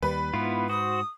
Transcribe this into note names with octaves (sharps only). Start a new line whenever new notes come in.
D#2 G3 B4
G#2 B3 E4 F4
F#4 C5 D#6